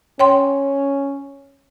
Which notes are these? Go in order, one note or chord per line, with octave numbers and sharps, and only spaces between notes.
C#4 C#5 G5 C6